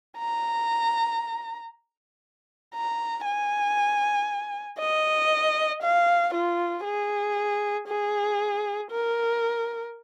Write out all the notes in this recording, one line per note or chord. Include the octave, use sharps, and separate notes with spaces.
A#5
A#5
G#5
D#5
F5
F4
G#4
G#4
A#4